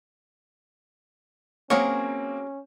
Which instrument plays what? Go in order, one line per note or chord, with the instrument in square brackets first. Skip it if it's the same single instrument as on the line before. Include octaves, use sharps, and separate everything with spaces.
[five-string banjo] F#3 G#4 A#4 [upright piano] A#3 C4 [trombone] C#4 [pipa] C#5